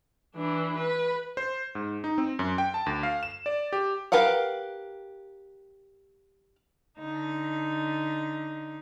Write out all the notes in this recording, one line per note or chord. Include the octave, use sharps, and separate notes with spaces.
E3 D4
B4
C5
G#2
D#4
C4
F#2
G5
A5
D2
F5
E7
D5
G4
G4 A#4 B4 F5 F#5
D3 D#4